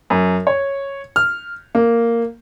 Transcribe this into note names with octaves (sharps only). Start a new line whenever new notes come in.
F#2
C#5
F6
A#3